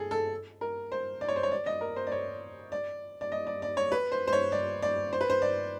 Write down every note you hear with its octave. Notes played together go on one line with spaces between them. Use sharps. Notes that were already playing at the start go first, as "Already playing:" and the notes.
Already playing: G#4 A4
A4
A#4
C5
D5
C#5
C5
C#5
D5
D#5
A#4
C5
D5
C#5
D5
D5
D#5
D5
D5
C#5
B4
C5
C5
C#5
D5
D5
C5
B4
C5
D5